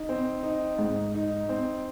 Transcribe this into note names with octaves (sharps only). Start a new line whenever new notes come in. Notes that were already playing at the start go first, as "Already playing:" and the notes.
Already playing: D#4
C4
D#4
G#2
D#4
C4